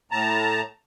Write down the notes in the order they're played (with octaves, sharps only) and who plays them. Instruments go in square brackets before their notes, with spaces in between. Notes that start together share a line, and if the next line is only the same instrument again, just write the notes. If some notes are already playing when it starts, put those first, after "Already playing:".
[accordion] A2 A5 A#5